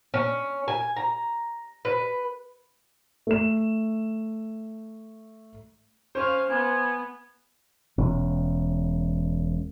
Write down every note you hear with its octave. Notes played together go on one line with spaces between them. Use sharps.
C#4
G#5
A#5
B4
A3 E7
C#4 C5 F5
B3 G#5
E1 C#4